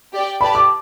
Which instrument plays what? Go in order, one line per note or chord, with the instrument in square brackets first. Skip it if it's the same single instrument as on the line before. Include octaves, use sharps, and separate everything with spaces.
[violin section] G4 D5 G5
[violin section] G4 B4 D5 A5 [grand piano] B5
[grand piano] D6